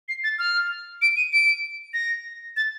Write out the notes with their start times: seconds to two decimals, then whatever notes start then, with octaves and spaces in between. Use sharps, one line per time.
0.09 C7
0.24 A6
0.39 F6
1.02 D7
1.17 D#7
1.33 D7
1.94 A#6
2.57 A6